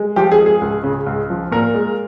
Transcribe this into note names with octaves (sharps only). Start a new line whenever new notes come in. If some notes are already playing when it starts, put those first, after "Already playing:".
Already playing: G#3
F3 G4
G#4
G#3
G#4
C#2
C#3
C#2
F3
A#2 A#4
G#3